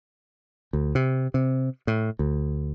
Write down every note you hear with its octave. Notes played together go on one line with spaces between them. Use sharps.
D2
C3
C3
A2
D2